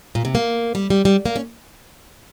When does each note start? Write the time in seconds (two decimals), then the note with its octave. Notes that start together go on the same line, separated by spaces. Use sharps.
0.15 A#2
0.25 C3
0.35 A#3
0.75 G3
0.90 G3
1.05 G3
1.26 A#3
1.36 C#4